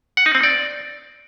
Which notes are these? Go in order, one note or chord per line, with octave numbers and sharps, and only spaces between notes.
F#5
D#4
C4
D5